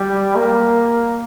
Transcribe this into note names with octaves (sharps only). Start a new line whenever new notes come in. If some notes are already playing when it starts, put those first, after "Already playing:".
Already playing: G3
A#3